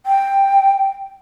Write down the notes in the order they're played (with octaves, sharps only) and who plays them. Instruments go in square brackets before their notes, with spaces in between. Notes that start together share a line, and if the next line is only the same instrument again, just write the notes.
[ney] G5